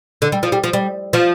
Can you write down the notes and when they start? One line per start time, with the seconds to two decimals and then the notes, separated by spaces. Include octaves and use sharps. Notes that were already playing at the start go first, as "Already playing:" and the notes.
0.22 D3
0.32 G3
0.43 F3
0.52 G3
0.64 F3
0.73 G3
1.13 F3